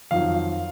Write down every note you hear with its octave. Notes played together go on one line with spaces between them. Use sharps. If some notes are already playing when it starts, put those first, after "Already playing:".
F2 D#3 F#3 F5